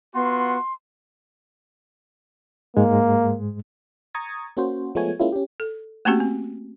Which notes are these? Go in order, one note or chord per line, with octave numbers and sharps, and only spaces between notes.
B3 F4 F#4 F#5 C6
G#2 G#3 A#3
A#5 C#6 D#6 G#6 A6
A#3 C#4 F#4 C5
F3 G#3 A3 B3 C#5 G#5
G#3 A#3 C#4 E4 F4
C#4 G4
A4
A3 A#3 C4 C#4 F#4 G4
C4